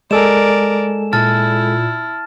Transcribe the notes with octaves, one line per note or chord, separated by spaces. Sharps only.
G#3 A4 A#4 D5 G#5 E7
A#2 E4 A5 F6 A6